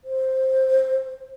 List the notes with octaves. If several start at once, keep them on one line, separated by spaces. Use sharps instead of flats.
C5